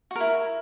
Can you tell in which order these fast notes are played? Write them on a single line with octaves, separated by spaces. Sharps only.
F#4 A#4 E4